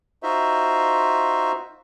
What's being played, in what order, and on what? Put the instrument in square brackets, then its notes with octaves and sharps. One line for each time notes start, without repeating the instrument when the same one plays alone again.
[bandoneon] D#4 F4 F#4 C5 E5